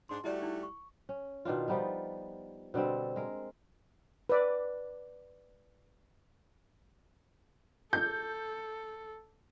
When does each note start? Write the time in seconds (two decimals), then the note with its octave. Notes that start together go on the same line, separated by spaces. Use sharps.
0.09 G#2 D4 C6
0.24 G3 A3 E4 F#4 D5
0.42 D#4 E4
0.63 C#6
1.09 C#4
1.45 B2 D#3 D4 F4
1.68 F3 G3 B3 D#4
2.74 B2 D3 G3 C4
3.16 G#3 A#4
4.29 B4 D5
7.93 A4 G6